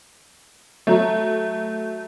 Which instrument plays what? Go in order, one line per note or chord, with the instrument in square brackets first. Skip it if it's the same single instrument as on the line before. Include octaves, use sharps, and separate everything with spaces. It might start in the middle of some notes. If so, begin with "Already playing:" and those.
[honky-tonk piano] F#3 A3